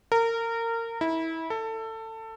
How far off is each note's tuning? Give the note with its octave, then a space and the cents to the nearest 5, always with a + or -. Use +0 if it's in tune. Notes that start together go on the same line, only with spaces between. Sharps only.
A#4 -25
E4 -25
A4 +20